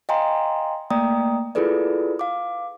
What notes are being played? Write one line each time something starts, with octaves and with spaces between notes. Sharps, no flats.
D#5 F5 G5 G#5 A#5 C6
A3 A#3 D5 G5 A#5 D#6
E4 F4 G#4 A4 B4 D5
F5 D6